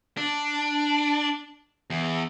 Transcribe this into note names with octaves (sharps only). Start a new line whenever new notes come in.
D4
E2